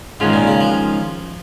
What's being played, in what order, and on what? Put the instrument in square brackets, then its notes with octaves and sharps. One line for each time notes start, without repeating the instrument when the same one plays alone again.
[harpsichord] G#2 [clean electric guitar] D#3 G#3 C#4 F4
[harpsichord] A#2
C#3
F3